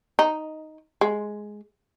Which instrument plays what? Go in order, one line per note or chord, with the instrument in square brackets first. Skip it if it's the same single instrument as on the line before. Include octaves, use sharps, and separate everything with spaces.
[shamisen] D#4
G#3